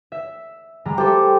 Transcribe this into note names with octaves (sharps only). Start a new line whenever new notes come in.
E5
G3 G#3 A#5
G4 A4 C5